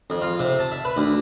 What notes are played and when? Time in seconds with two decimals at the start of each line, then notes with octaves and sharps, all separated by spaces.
0.10 F2
0.22 F4
0.39 C3
0.59 A5
0.72 E5
0.85 B4
0.97 D2